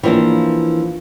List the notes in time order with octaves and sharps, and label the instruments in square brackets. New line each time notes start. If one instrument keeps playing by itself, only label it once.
[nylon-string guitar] E3 F3 G3 A#3 D4